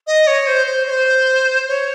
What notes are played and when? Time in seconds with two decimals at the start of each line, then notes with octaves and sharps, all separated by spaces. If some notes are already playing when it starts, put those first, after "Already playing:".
0.07 D#5
0.27 C#5
0.47 C5
0.67 C5
0.87 C#5
0.90 C5
1.68 C#5